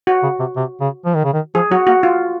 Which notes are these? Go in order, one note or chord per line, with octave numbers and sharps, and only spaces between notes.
F#4
C#3
C3
C3
C#3
F3
D#3
C#3
D#3
F3 G#4
F#3 F#4
A#3 F#4
F4